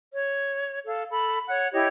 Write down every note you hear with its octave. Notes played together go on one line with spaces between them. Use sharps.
C#5
A4 F5
A4 B5
C#5 F#5
E4 G4 C#5 D#5